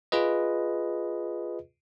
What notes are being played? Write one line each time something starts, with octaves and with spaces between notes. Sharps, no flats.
F4 G#4 B4 D#5